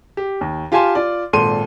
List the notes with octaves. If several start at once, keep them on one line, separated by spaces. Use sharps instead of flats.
G4
D#2
F4 G4 F5 G#5 A5 C6
F4 D5
G#1 A#2 A4 C6 D#7